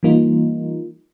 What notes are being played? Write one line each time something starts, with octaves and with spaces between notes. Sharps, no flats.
E3 G3 A#3 D#4 F4